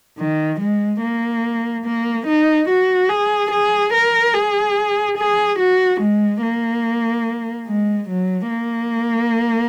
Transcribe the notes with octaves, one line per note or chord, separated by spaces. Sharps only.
D#3
G#3
A#3
A#3
D#4
F#4
G#4
G#4
A#4
G#4
G#4
F#4
G#3
A#3
G#3
F#3
A#3